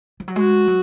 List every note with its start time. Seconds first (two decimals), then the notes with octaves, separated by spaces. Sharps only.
0.20 F3
0.28 F#3
0.36 G#3 F#4
0.67 F#3